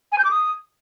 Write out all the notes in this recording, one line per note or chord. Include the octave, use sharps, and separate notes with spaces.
G#5
G6
D6
D#6